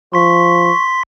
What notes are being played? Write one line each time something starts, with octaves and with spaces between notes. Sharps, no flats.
F3 C6 C#6 B6